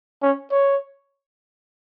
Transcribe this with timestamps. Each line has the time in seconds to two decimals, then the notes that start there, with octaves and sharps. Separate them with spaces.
0.22 C#4
0.51 C#5